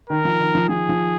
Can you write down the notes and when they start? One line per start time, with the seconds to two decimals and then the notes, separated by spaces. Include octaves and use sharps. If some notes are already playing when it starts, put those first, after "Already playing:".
0.10 D#3 A#4
0.25 F3
0.40 D#3
0.55 F3
0.69 F3 G#4
0.89 F3